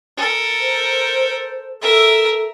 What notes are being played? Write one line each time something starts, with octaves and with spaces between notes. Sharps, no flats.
A4 A#4
C5
A4 A#4 E5